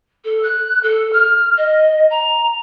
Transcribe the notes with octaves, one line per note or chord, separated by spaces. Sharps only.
A4
F#6
A4
F6
D#5
A#5